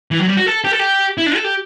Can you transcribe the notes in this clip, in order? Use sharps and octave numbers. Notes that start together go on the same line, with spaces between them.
E3
F#3
G3
F#4
A4
G4
A4
G4
E4
D4
A4
G4